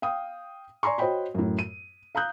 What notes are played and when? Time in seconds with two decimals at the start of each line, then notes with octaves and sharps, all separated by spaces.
0.02 F5 G5 D#6
0.83 D5 G#5 A#5 C6 C#6
0.98 F#4 C5 C#5 D#5 G5 B5
1.35 F#2 A2
1.59 D#7
2.15 F5 A#5 D#6 F#6 G6